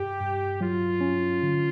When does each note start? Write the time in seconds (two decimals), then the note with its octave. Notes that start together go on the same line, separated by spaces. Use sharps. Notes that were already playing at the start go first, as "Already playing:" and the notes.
Already playing: G2 G4
0.20 G2
0.61 F#3 F4
1.01 C#4
1.42 D3